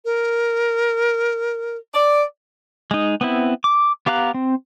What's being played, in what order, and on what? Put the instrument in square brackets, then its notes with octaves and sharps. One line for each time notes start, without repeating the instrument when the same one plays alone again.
[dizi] A#4
[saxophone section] D5
[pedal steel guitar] G#3 D#4
B3 C4 E4
D6
B3 G4 F5 A#5 F#6
C4